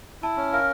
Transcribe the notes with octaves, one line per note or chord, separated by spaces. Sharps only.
E4 A5
C#4
A#4 F5